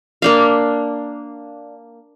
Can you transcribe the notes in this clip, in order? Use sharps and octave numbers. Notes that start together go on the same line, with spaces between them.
A#3 D4 F5